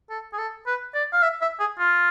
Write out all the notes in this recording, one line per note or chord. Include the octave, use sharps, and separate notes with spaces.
A4
G#4
A4
B4
D5
F5
E5
E5
G#4
F4